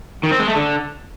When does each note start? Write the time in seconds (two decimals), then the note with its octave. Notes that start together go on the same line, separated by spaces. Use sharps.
0.23 D#3
0.31 C4
0.39 G#3
0.47 A3
0.55 D3